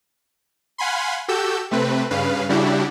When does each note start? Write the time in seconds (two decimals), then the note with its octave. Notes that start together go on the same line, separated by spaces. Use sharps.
0.78 F5 F#5 G#5 B5 C6
1.28 F#4 G4 A4 E6 G6
1.71 C3 A3 C4 B4
2.11 G2 C#3 B4 F5
2.49 C#3 G3 D4 E4 F#4 G4